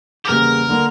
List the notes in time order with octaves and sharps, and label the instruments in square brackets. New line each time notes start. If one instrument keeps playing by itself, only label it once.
[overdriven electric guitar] G4
[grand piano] E2 C#3 G3 A#3 [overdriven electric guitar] A#4
[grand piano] D3 A#3